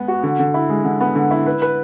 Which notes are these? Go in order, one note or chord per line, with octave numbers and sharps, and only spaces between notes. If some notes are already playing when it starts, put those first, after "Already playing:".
Already playing: G#3 B3
F#4
D3
D3
E4
G#3
D3
B3
D3
E4
B4
B4